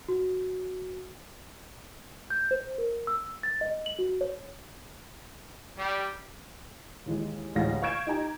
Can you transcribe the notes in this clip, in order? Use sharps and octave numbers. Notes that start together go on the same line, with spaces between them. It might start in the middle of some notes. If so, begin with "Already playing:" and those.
F#4
G6
C5
A#4
E6
A6
D#5
F#7
F#4
C#5
G3
D#2 E3 G#3
A1 D2 E3 G#3 F5 A#6
F5 C#6 G6 G#6 D7 E7
D#4 G4 A#5